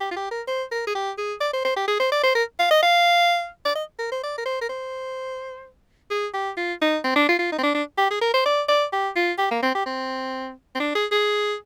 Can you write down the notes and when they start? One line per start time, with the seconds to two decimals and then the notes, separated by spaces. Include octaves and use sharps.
0.01 G4
0.11 F4
0.16 G4
0.31 A#4
0.47 C5
0.72 A#4
0.87 G#4
0.95 G4
1.18 G#4
1.41 D5
1.54 C5
1.65 C5
1.76 G4
1.88 G#4
2.00 C5
2.12 D5
2.24 C5
2.35 A#4
2.59 F5
2.71 D#5
2.83 F5
3.65 D5
3.75 D#5
3.99 A#4
4.12 C5
4.23 D5
4.38 A#4
4.46 C5
4.61 A#4
4.69 C5
6.11 G#4
6.34 G4
6.57 F4
6.82 D#4
7.04 C4
7.16 D4
7.28 F4
7.39 F4
7.52 D#4
7.58 C4
7.63 D4
7.75 D4
7.98 G4
8.11 G#4
8.21 A#4
8.34 C5
8.46 D5
8.68 D5
8.93 G4
9.16 F4
9.38 G4
9.51 A#3
9.63 C4
9.75 G4
9.86 C4
10.75 C4
10.80 D4
10.95 G#4
11.12 G#4